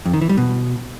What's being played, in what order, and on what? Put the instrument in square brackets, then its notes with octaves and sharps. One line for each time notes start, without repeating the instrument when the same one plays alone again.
[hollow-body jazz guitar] F2
D#3
E3
G3
B2